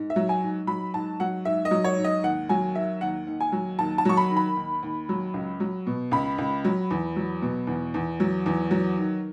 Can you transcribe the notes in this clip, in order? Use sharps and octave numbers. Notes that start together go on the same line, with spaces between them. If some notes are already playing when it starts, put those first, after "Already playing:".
Already playing: G#2
E5
F#3
G#5
G#2
F#3 B5
G#2 A5
F#3 F#5
G#2 E5
D#5
F#3
C#5
G#2
D#5
D#2 F#5
F#3 G#5
D#3 E5
D#2 F#5
D#2
G#5
F#3
D#2 A5
A5
F#3 C#6
B5
D#3
B5
D#2
D#2
F#3
C#2
F#3
B2
C#2 B5
C#2
F#3
E2
F#3
B2
E2
E2
F#3
E2
F#3
D#3